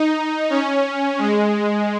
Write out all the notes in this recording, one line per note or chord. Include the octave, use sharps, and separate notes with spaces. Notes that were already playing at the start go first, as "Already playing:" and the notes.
Already playing: D#4
C#4
G#3